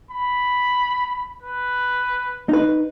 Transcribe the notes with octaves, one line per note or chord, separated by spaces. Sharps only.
B5
B4
D#4 B4